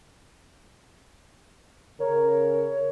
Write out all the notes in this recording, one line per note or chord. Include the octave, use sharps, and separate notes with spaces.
C#3 A#4 C#5